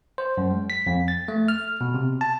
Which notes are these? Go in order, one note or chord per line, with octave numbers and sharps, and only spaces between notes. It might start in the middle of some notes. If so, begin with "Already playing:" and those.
C5
F#2
G#3
B6
F2
A6
A3
F6
B2
C3
A5